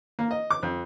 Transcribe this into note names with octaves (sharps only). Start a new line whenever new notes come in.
A#3
D#5
D6
F2